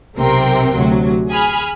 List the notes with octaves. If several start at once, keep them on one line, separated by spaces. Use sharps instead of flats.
B1 C3 C4 A#4 G5 C6
D2 C3 F#3
G#4 G#5 B5 F6